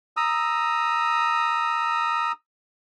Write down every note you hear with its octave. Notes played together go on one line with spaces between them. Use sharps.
A#5 D#6 E6